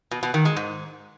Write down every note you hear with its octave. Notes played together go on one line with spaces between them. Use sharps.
B2
B2
D#3
G#3
G#2